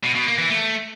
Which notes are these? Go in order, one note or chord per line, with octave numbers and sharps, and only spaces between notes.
B2
B2
A#3
E3
A3